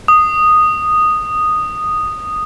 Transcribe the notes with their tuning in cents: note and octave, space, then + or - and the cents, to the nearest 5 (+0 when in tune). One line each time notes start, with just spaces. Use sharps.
D#6 -10